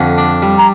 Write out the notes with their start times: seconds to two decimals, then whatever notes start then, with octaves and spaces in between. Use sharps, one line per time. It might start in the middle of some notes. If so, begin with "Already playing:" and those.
Already playing: F2 D3
0.18 D4
0.42 G3
0.58 A#5